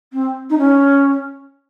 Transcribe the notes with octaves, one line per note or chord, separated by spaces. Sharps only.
C4
D#4
C#4